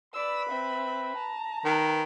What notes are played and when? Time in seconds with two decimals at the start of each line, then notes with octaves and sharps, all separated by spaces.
0.14 B4 D5 B5 E6
0.50 C4 E5
1.17 A5 A#5
1.65 D#3 B4